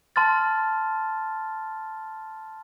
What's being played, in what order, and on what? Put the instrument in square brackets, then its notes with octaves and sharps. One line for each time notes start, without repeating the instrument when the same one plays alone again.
[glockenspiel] A5 C6 F6 A6